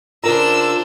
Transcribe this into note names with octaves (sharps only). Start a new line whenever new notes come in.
C#3 D4 F4 A#4 C5 A#5 E6